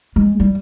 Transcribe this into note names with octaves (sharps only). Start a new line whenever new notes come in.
G#3
G3